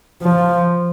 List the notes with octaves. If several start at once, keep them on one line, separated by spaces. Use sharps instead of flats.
F3